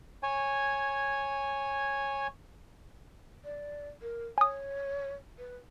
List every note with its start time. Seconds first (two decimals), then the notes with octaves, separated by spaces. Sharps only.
0.23 C#5 G#5
3.45 D5
4.02 A#4
4.38 C#5 G#5 D#6
5.38 B4